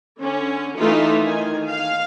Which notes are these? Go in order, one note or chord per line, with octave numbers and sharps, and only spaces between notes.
D3 C#4
E3 A3 D#4 F4 E5
D#3 G#5
F5